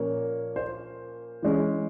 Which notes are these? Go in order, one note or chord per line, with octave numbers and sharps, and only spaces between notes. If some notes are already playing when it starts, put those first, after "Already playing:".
Already playing: A#2 F3 A#3 C#4 C#5
C5
E3 G#3 C#4